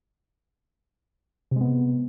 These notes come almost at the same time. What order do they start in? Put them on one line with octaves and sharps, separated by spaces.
C3 G#3 B3